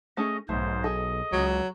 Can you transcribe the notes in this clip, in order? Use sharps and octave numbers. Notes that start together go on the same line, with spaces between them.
A3 C#4 G#4 D#5
B1 G#2 A3 C5
G#4 A4 D#5
C#2 F#3